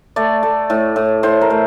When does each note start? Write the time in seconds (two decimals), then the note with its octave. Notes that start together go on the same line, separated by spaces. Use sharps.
0.16 A3 D5
0.43 A3
0.70 A2
0.96 A2
1.23 A2 C5
1.41 A#4
1.50 A3